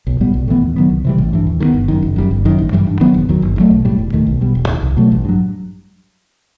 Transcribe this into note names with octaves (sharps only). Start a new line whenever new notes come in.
B1
A2 G3 B3
B1
A2 E3 B3
D#2
D#3 F#3 B3
C2
C3 E3 G3
A1
G2 E3
D#2
D#3 G3 B3
G1
F#2 D#3
F#1
F#2 D#3 G3
G1
F#2 D#3
A1
G2 E3 G3
G2
D#3 F#3 B3
E1
D#2 D#3 F#3
G1
G2
F#3 A3
B1
A2 G3
E1
D#2 D#3 A3
B1
B2 G3
E1
D#2 D#3
C2
B2 F#3 A3
A1
G2 F#3